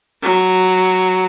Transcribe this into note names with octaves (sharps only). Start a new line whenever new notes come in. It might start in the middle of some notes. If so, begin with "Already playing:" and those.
F#3